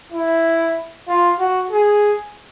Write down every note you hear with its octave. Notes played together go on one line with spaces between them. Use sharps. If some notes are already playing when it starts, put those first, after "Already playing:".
E4
F4
F#4
G#4